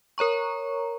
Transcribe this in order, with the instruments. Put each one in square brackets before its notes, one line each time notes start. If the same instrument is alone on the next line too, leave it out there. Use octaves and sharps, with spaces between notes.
[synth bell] A#4 C#5 A#5 C#6